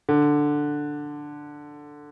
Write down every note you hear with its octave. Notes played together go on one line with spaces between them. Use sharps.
D3